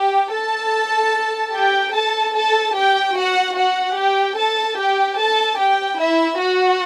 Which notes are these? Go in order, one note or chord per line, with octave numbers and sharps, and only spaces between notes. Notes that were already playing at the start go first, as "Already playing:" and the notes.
Already playing: G4 G5
A4 A5
G4 G5
A4 A5
A4 A5
G4 G5
F#4 F#5
F#4 F#5
G4 G5
A4 A5
G4 G5
A4 A5
G4 G5
E4 E5
F#4 F#5